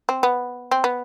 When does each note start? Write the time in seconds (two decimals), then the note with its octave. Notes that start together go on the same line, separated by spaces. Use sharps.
0.09 C4
0.23 B3
0.71 C4
0.84 B3